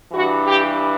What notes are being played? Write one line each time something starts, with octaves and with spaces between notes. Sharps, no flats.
G2 E3 F#4
G4